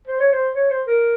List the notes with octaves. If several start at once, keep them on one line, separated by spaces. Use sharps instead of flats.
C5
C#5
C5
C#5
C5
A#4